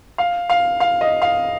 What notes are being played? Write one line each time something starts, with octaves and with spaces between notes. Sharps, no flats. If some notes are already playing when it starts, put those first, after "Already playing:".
F5
F5
F5
D#5
F5